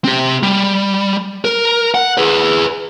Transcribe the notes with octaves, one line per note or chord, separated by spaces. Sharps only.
C4 G4
G3
A#4
F#5
G#4 B4